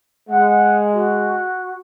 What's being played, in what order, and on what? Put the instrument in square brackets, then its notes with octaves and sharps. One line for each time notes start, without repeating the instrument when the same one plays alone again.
[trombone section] G#3 [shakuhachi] F#5
[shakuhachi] F#4